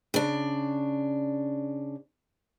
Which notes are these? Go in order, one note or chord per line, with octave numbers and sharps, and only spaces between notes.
C#3 D4